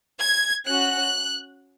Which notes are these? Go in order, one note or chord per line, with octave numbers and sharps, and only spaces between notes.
G#6
C#4 F#4 F#6